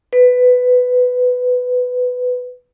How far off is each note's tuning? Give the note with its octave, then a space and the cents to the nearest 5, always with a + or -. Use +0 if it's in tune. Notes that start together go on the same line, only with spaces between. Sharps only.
B4 +10